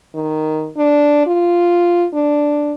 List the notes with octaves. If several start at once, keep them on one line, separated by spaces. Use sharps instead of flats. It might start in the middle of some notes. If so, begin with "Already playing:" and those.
D#3
D4
F4
D4